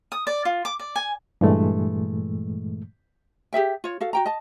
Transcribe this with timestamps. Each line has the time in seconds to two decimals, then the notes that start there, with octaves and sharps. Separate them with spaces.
0.12 D#6
0.27 D5
0.45 F4
0.65 D6
0.79 D5
0.96 G#5
1.41 G2 A#2 E3 G#3 A3
3.53 G4 G#4 E5 G5
3.84 F4 C#5
4.00 F#4 A4 F5
4.13 F#4 G5 A#5
4.26 D#5 A5